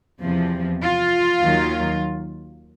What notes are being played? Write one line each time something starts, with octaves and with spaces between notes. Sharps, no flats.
E2 C3 F3
F4
D#2 D#3 F#3